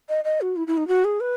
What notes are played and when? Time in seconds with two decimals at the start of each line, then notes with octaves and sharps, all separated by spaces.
0.09 D#5
0.24 D#5
0.41 F#4
0.56 E4
0.67 E4
0.77 D#4
0.88 F#4
1.04 G#4
1.20 B4